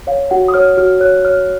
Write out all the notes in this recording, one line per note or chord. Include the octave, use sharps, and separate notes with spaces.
C#5 F5
F#4 F#5
D#6
C#5 F6
F#4 F6
C#5 F#6
C#5 F6